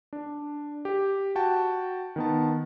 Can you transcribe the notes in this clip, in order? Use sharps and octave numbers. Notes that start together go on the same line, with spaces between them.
D4
G4
F#4 G5 A5
D#3 B3 A5